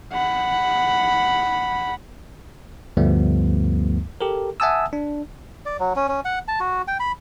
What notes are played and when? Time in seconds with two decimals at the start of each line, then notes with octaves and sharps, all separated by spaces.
0.13 F#5 B5
2.97 D2 G2 F3 G3 A3 B3
4.21 G4 A4 A#4
4.60 E5 F#5 G#5 A5 D#6 E6
4.93 D4
5.66 D5
5.79 F#3
5.96 C#4
6.08 C#4
6.25 F#5
6.48 A5
6.60 F#4
6.88 G5
7.00 B5